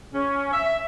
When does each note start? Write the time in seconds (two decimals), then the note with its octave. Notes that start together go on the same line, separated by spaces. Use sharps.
0.14 C#4
0.52 E5